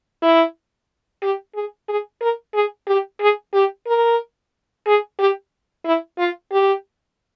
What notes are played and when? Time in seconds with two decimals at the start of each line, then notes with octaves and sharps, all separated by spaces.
0.22 E4
1.22 G4
1.54 G#4
1.88 G#4
2.21 A#4
2.54 G#4
2.87 G4
3.20 G#4
3.54 G4
3.87 A#4
4.87 G#4
5.19 G4
5.85 E4
6.18 F4
6.52 G4